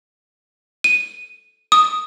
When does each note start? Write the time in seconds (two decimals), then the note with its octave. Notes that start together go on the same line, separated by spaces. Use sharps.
0.84 D#7
1.72 D#6